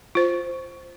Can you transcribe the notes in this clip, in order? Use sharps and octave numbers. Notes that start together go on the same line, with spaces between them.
F4 C5